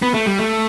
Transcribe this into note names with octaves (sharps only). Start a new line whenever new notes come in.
B3
A3
G3
A3